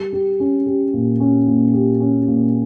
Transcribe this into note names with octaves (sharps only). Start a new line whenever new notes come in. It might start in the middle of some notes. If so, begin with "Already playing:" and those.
Already playing: G3
G4
C#4
G4
A#2
C#4
A#2
G4
C#4
A#2